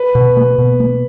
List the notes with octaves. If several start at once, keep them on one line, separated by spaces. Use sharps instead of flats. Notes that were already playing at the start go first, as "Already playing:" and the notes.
Already playing: B4
B2
A#3
B2
A#3